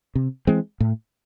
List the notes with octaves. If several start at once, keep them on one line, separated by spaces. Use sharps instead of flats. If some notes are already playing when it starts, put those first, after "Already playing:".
C3
E3 G#3 C4
A2